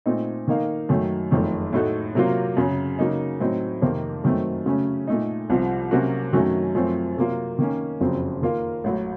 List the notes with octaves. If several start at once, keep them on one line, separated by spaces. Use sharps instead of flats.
A#2 A3 C4 D#4
D#3 A#3 D#4 A#4 F5
F#2 D#3 F#3 A3
F#1 F2 D#3 A3
A2 A3 D#4 F#4 A4
C3 F#3 A#3 F4
F#2 C#3 F#3
C#3 F#3 A#3 D#4
A2 F#3 C4 D#4
F2 C3 D#3 A#3 F4
F#2 D#3 F#3 A3 C4
C#3 F#3 A3 C#4
A#2 A3 D#4
C2 C3 F3
C3 F#3 A#3 C#4 F#4
F#2 D#3 F#3 A3 C#4
F#2 F3 A3 C4
C3 F#3 A#3 F4
D#3 A#3 C#4
F#1 F2 C#3 F#3 C4
D#3 A#3 F4 A#4 F5
A1 A2 F#3